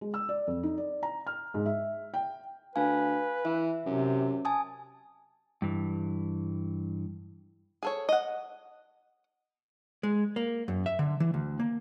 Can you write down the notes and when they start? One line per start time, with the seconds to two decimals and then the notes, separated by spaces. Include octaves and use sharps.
0.01 G#3
0.14 E6
0.29 D5
0.47 F2
0.63 D#4
0.78 D5
1.03 A#5
1.27 F6
1.54 G#2
1.66 E5
2.14 G5
2.76 D2 B4 F5 G#5
3.45 E3 E5
3.86 F#2 C3
4.45 G#5 A5 D#6
5.62 G2 E3
7.83 G#4 A4 C#5
8.09 D#5 F#5
10.03 G#3
10.36 A#3
10.68 F#2
10.86 E5
10.99 D3
11.20 E3
11.34 D2
11.60 A#3